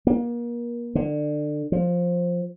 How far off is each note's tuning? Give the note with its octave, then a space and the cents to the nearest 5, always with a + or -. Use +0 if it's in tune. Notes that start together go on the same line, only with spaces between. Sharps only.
A#3 +35
D3 +25
F3 +10